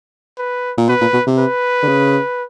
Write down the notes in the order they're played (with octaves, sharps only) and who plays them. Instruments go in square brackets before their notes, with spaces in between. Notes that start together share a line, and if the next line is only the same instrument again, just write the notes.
[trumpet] B4
[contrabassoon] A#2
[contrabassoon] B2 [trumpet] B4
[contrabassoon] A#2
B2
C3
[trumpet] B4
[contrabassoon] D3
C#3